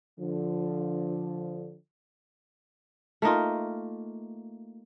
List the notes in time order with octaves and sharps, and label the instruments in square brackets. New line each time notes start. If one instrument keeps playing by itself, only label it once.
[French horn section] D3 F3
[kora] A3 A#3 D#4 F4